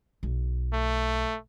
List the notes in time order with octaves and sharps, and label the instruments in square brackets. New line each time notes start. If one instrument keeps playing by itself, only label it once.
[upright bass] B1
[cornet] A3